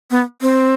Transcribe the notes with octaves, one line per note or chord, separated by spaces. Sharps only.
B3
C4